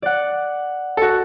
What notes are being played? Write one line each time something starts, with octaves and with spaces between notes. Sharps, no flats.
D5 F#5
F#4 A4